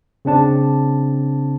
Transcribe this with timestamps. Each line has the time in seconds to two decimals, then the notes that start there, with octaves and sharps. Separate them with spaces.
0.25 C#3 C4 D4 A5